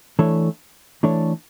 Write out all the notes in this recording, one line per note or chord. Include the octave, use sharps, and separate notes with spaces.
E3 A3 D4 A4 C#5
E3 A3 D4 A4 C#5